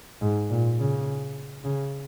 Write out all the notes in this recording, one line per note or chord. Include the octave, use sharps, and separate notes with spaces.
G#2
A#2
C#3
C#3